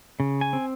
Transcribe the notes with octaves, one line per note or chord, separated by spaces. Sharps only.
C#3
G#5
C4